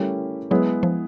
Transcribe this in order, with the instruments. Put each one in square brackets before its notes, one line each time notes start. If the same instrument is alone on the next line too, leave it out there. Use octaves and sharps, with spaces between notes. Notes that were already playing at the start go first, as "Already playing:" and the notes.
Already playing: [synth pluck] G3 [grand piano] A3 C#4 E4 G4 A#4
[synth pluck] F#3 [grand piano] G#3 B3 E4 G#4 B4
[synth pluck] F3